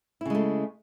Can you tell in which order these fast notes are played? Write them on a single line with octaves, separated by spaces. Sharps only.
E4 C#3 G#3 A3